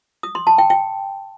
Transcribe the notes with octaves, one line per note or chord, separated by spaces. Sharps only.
D#6
C6
A5
G5
G5